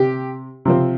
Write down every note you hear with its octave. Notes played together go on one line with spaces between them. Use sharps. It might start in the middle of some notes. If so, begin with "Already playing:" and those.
Already playing: C3 G4
C3 F3 C4